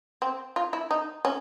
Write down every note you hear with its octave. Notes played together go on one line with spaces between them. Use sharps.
C4
F4
E4
D#4
C#4